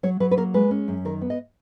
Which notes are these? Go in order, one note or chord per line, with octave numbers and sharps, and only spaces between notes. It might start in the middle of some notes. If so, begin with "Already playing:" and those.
F#3 C#5
F#3 B4
B4
A#3 A#4
G#3 B4
C#4
F#2
D#3 A#4
B3
D#5